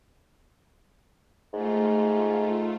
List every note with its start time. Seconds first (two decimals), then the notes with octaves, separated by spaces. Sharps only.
1.53 G#2 A3 F4